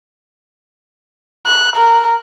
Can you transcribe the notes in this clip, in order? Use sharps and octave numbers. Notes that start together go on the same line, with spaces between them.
F#6
A#4